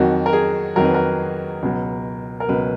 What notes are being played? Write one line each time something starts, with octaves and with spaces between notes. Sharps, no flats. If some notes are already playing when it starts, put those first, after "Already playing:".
Already playing: F2 D#3 F#3 F#4
A#4
G#4
F2 D#3 F#3 A#4
B4
A#4
C#2 B2 F#3
A#4
C#2 B2 F#3 B4